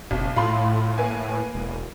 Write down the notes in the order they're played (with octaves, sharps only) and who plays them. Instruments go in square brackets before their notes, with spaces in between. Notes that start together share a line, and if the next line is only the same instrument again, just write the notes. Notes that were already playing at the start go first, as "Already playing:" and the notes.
[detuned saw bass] F#1 [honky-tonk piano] B1
[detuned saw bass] A2 [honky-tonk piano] F4 B5 C6
[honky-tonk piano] A#3 B4 G#5
[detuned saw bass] E1